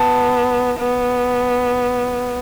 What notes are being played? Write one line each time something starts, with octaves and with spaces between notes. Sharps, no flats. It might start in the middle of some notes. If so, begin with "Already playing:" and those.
Already playing: B3 A5
B3